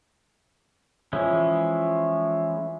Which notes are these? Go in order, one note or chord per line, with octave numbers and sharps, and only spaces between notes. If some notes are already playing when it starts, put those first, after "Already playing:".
E3 F3 G#3 C#4 E4